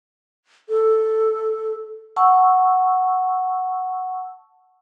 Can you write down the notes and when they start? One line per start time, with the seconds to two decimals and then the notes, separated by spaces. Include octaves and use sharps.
0.69 A4
2.16 F#5 A5 C#6 E6